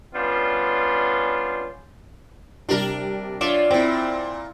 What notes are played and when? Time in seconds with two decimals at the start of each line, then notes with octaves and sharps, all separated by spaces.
0.15 G3 B3 C#4 D4 F4
2.69 C3 G3 D4 A#4
3.41 D4 F4 C#5 D5 E5 G5
3.71 A#2 C4 E4 D6